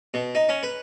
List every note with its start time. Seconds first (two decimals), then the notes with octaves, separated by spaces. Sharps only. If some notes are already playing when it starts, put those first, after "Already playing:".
0.14 B2
0.35 D#4
0.49 C#4
0.63 B4